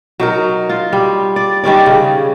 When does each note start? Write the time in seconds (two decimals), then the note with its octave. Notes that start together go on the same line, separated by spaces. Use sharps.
0.20 F#3 D#4 A#4
0.69 F4
0.93 G3
1.36 D5
1.64 D#3 G3 C#4 D5
1.86 C#3